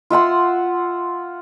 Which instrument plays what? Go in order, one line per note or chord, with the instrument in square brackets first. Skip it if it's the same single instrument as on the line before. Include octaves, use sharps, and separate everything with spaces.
[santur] F4 E5 F#5 C6